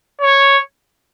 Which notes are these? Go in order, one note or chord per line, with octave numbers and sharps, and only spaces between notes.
C#5